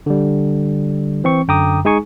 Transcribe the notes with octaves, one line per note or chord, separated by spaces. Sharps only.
D3 G3
E3 C4 C#6
F#2 D3 G5 A#5 D6 D#6
G#3 D#4 G#4 G#5 C#6